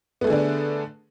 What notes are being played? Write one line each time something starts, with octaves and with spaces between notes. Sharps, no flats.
D3 A3 B3 D4 G#4